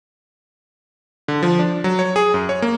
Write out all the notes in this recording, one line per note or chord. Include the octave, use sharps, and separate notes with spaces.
D3
F3
D4
F#3
C#5
G#4
F#2
C#5
A#3